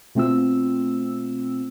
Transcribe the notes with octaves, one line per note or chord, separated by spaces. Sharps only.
B2 A3 C4 F4 E6